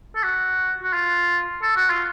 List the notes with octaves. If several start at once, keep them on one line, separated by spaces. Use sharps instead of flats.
A4
F#4
F#4
F4
A4
F#4
F4